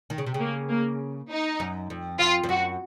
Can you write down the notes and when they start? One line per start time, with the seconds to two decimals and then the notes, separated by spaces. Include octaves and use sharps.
0.10 D#3
0.18 C#3
0.26 C3
0.34 C#3
0.40 A#3
0.70 A#3
1.30 D#4
1.60 F#2
1.90 F2
2.19 F2 F4
2.44 F2
2.49 F#2 F#4